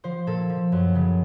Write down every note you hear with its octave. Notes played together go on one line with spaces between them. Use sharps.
F3 C5
A#2 A4
F3
F#2
C#3